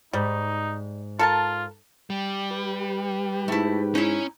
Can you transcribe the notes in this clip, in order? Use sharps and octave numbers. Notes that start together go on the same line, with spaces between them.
G#2 G3 D#4
F4 A4 A#4 A5
G3
G4 B4
G#2 A3 E4
C#4 D#4 E4